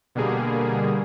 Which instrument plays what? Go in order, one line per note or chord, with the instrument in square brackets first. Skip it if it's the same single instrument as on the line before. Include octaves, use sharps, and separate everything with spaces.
[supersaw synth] B2 D3 G3 A#3 G#4